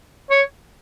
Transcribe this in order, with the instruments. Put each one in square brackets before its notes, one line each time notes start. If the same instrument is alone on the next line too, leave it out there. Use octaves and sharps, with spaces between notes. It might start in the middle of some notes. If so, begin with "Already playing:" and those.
[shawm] C#5